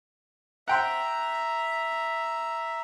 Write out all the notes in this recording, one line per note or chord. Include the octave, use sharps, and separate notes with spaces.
E5 F#5 G5 A#5 C6